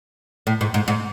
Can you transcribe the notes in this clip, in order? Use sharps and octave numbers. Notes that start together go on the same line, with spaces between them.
A2
G#2
G#2
G#2